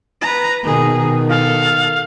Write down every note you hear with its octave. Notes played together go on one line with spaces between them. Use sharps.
B4 A#5
B2 D#3 G#4
A4 F5